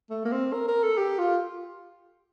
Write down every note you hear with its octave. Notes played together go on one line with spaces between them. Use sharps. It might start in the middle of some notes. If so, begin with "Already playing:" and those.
A3
A#3
C4
A#4
A#4
A4
G4
F4